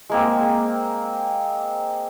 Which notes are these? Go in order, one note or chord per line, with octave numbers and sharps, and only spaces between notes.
G#3 A#3 C4